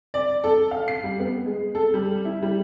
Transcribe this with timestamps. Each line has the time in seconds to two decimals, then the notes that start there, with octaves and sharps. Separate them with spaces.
0.14 D5
0.44 A4
0.71 F5
0.88 C7
1.03 G3
1.20 B3
1.46 G#3
1.75 A4
1.94 G3
2.25 E4
2.42 G3